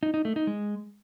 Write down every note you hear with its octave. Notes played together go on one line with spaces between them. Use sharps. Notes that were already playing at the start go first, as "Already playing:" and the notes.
D#4
D#4
A3
D#4
G#3